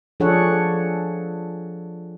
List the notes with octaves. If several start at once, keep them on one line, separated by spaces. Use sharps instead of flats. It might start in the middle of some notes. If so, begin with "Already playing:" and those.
F3 D4 G#4 A4 C#5 F#5